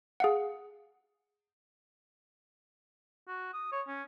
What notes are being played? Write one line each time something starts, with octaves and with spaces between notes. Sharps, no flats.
G#4 F5 F#5
F#4
D#6
C#5
C#4